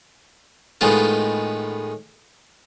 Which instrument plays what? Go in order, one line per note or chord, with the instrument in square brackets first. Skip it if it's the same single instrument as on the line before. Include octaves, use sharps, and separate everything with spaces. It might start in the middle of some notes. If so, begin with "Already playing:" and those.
[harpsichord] A2 D#3 G#3 B3 F4